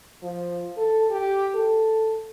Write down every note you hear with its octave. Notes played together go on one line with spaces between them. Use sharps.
F3
A4
G4
A4